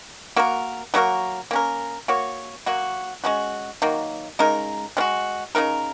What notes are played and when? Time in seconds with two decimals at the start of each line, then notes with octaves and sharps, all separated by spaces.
0.36 A#3 F#4 A#4
0.94 F#3 A#3 F#4 A#4
1.51 A#3 C#4 A#4
2.08 A#3 F#4 C#5
2.66 F#3 A#3 F#4
3.24 G#3 C#4 F#4
3.82 D#3 F#3 A#3
4.39 C#3 G#3 D#4 A#4
4.97 G#3 C#4 F#4
5.55 C#3 G#3 D#4 A#4